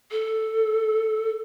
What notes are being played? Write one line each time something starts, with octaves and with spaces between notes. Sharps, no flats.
A4